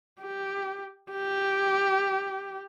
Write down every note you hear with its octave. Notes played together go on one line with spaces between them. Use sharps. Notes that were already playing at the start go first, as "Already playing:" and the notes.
G4
G4